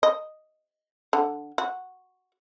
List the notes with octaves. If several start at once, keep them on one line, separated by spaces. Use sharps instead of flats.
D#5
D3
F#4